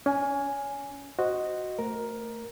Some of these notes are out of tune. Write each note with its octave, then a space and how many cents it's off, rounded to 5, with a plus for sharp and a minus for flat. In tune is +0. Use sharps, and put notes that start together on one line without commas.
C#4 +30 G#5 +0
F#4 +0 C5 +0 D#5 +0
A3 +25 A#4 +10